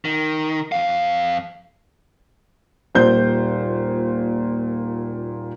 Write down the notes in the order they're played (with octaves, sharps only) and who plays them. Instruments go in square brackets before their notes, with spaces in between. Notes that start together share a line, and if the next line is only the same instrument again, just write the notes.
[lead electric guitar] D#3
F2 F5
[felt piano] D#1 A#2 C5 G6